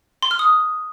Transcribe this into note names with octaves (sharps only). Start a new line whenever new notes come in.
C6
F6
D#6